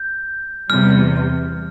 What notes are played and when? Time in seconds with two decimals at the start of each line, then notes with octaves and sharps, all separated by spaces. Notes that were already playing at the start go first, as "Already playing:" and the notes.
Already playing: G6
0.70 E2 C3 G3 F6